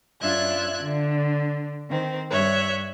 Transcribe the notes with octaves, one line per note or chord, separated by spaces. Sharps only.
F#2 D4 F4 E5 F#6 G#6
D3
D#3 C4
G2 C#5 E5 F#6